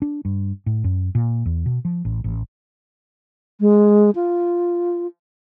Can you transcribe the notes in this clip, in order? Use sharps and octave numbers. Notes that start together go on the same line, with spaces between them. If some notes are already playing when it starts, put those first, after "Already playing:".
D4
G2
A2
F#2
A#2
E2
B2
F3
A1
A1
G#3
F4